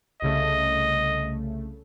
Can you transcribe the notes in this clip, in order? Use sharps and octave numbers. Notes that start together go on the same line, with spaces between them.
C2 C#3 A3 D#5